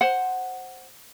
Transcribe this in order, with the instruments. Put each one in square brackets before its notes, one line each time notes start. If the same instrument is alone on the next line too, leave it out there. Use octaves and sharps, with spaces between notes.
[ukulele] C5 F#5